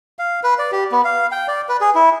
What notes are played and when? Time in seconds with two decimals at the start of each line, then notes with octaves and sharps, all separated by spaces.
0.19 F5
0.43 B4
0.58 D5
0.72 G4
0.92 B3
1.04 F5
1.32 G5
1.48 D5
1.69 B4
1.81 G#4
1.95 E4